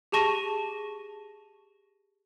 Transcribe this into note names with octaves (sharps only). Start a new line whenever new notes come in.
G4 G#4 A5 C#6 A#6 D#7